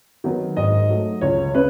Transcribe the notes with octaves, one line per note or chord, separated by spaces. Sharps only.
D#3 F#3 B3
G#2 D#5
F#3 A3
C#2 C#5
C#3 B4